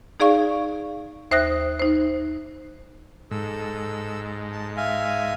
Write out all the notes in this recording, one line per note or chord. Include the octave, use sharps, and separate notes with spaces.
D#4 G#4 D5 F5 C#6
D#2 C5 E5 D#6 F#6 A#6
D#4 C5
G#2 A4 E6
A5
E5 F5 G#5